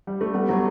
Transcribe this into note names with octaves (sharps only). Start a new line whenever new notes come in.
G3
A3
G3 B3
F#3 A3